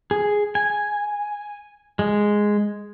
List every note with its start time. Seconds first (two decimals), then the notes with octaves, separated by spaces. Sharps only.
0.11 G#4
0.55 G#5
1.99 G#3